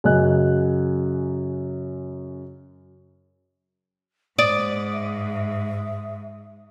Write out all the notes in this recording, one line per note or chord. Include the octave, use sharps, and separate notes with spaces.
F#2 C#3 F#3 D#5 G#5 F#6
G#2 C5 D5 D#6
E5